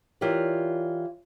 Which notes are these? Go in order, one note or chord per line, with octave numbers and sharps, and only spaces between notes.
E3 F4 G4 A#4 C#5 D5